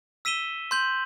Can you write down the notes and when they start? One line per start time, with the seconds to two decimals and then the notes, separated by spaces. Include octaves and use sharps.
0.25 E6 B6 D#7 E7 G7
0.71 C6 G6 F#7